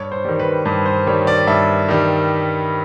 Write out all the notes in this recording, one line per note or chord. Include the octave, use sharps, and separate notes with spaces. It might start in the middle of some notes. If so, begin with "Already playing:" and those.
Already playing: G2 C#5
C5
D#3 G3
B4
G2 C5
C5
D#3 G3 C#5
D5
G2 E5
D#3 G3